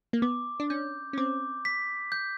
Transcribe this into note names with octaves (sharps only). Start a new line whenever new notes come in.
A#3
B3 D6
D4
C#4 G6
C#4
C4 D6
B6
G6